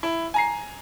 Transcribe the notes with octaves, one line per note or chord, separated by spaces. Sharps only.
E4
G#5 A#5 C7